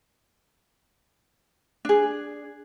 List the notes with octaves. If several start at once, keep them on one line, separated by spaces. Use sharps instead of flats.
D4 G#4